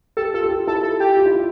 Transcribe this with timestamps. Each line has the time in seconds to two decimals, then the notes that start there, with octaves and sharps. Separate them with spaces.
0.17 G4 A4
0.34 F4 A4
0.44 G4
0.51 F4
0.67 E4 A4
0.83 A4
1.00 G4
1.17 F4
1.26 E4
1.34 F4